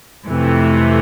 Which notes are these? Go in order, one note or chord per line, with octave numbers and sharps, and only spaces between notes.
F2 C3 E3 A3